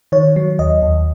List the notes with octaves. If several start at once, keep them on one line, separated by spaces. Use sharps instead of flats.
D#3 C#5
F#3
D#2 D#5
D#2